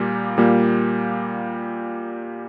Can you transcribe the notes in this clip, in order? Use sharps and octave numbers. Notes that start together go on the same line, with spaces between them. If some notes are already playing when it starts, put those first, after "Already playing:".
Already playing: A#2 G3 A#3
A#2 G3 A#3